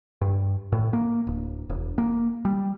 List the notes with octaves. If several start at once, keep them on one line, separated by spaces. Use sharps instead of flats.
G2
A2
A#3
D1
E1
A#3
G3